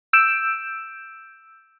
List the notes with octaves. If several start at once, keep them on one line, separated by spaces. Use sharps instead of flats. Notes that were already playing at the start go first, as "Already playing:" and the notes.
E6 G6 D7 E7